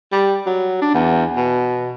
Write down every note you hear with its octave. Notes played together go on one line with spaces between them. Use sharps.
G3
F#3
D4
E2
B2